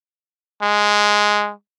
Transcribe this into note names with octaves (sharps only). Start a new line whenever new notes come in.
G#3